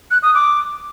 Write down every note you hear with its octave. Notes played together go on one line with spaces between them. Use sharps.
F#6
D#6
D6